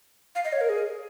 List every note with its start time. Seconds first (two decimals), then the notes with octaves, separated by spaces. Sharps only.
0.35 F5
0.45 D#5
0.53 C#5
0.61 A#4
0.69 G#4